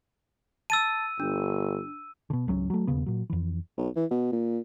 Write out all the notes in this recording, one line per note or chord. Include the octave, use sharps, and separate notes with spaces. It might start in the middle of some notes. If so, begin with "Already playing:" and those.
A5 E6 A6 D#7
G1 D4
B2 D3
G#1 C#2 F#3 C#4
F#3 A3
E1 D#2 C#3 B3
A#2 F#3
F2 E3
B1
E3
B2
A#2